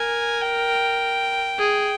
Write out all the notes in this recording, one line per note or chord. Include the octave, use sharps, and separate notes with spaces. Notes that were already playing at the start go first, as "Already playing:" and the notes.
Already playing: A#4 G#5
G5
G#4